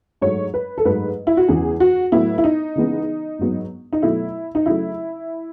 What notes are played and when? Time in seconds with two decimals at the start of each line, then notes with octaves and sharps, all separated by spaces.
0.21 G#2 F#3 A3 C#5
0.54 B4
0.78 A4
0.85 G#2 F#3 A3 B4
1.27 E4
1.37 F#4
1.48 E2 C#3 E3 G#3 G#4
1.80 F#4
2.12 A2 F#3 B3 E4
2.38 E4
2.44 D#4
2.76 C#3 E3 G#3 B3
3.39 G#2 F#3 B3
3.93 D#4
4.02 B2 F#3 A3 E4
4.55 D#4
4.66 C#3 F#3 A3 E4